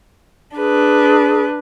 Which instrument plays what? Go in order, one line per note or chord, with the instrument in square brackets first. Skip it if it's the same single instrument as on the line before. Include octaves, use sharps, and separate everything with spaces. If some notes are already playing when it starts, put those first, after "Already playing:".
[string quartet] D4 B4 [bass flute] G#4